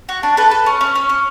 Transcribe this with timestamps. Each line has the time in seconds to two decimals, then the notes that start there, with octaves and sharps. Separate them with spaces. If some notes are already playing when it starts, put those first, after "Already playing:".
0.09 F#4
0.23 D4
0.37 A4 B4
0.51 A4
0.66 C#4
0.81 C#4
0.95 C#4
1.09 C#4